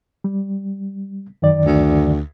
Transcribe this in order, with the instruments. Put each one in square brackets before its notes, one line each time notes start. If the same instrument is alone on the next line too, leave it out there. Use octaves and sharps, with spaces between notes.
[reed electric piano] G3
F#2 D#3 D5
[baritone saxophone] D2